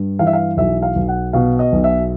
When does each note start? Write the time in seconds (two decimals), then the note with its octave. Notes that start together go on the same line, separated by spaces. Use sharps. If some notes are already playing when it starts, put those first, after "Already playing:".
Already playing: G2
0.19 E3 F5
0.27 E5
0.33 F5
0.57 B1 E5
0.82 F5
0.96 B1
1.08 F#5
1.33 B2 F5
1.59 D#5
1.72 B1
1.84 E5